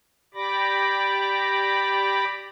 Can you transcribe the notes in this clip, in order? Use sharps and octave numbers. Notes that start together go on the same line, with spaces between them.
G4 D5 B5 D6 A#6